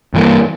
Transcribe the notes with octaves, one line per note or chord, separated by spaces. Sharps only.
G2 E3 G3 A#3